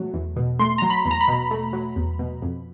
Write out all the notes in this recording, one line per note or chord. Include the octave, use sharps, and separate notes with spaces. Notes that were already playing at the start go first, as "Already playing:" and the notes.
Already playing: B2 F#3 A3
E2
B2
A3 C6
F#3 A#5
B5
E2
A#5
B5
B2
A3
F#3
E2
B2
F2